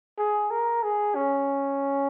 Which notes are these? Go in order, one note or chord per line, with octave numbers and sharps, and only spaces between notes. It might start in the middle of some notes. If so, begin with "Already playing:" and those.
G#4
A#4
G#4
C#4